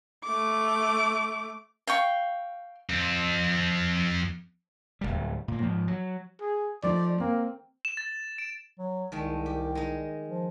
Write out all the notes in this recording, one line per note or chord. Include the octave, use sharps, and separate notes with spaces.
A3 D6
F5 G5 C#6
F2 C4
D1 G1 G3
A#2 A#3
G#2 F3
F#3
G#4
F3 A3 D#4 D5
A#3 C4
E7
A6
D7
F#3
C2 D#3 G#3 A3
G4
G#3 D#4
F3